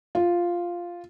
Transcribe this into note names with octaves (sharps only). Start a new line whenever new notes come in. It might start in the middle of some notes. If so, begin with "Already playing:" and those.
F4